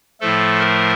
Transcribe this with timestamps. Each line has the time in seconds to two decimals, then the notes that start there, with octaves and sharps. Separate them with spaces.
0.21 A2 F3 A3 A4
0.59 A#4